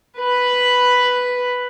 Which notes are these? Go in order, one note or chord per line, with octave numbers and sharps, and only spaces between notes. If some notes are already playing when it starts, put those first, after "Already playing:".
B4 B5